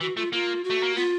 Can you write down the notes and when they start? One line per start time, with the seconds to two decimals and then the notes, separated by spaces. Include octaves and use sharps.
0.01 E3 F#4
0.17 A3 F4
0.33 A#3 F4
0.64 F#4
0.70 A3
0.83 A#3
0.96 B3 F4